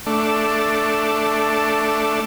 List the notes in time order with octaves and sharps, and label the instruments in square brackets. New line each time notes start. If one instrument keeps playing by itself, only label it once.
[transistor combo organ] A3 D4